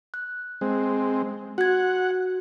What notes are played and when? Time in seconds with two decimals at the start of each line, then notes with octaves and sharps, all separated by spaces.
0.14 F#6
0.61 G#3 C4
1.58 F#4 F#5 G#6